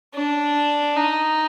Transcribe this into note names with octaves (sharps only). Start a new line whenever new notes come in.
D4
D#4